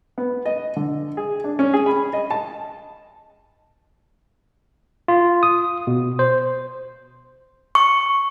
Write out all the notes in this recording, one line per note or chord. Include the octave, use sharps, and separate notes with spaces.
B3
D#5
D3
G#4
D4
C#4
G#4
B5
D#5
A5
F4
D#6
B2
C5
C#6